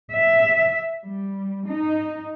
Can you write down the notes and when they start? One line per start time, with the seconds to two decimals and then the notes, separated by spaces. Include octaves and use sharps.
0.12 E5
1.03 G3
1.66 D#4